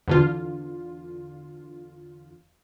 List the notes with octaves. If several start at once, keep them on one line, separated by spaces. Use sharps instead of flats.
E2 D3 F4